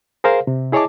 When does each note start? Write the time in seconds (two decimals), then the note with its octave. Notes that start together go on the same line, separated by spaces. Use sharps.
0.24 G#4 A#4 C5 F5
0.47 C3
0.72 E4 G#4 C#5 D#5 A5 D6